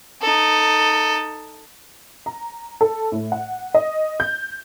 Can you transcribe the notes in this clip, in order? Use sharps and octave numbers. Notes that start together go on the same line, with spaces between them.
D#4 A4
A#5
A4
A2
F#5
D#5
G6